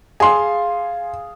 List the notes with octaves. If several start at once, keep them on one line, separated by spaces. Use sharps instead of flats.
G#4 F5 G#5 A5 C6